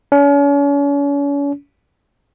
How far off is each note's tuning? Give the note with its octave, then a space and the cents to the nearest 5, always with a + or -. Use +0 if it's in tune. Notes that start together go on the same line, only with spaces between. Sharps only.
C#4 +40